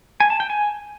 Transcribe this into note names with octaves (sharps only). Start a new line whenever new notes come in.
G#5
A5
G5
G#5